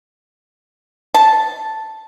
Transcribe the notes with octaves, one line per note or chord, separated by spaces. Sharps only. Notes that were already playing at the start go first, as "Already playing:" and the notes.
A5